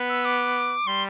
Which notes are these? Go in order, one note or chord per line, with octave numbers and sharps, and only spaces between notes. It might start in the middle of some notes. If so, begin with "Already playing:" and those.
Already playing: B3
E6
D6
G3 C6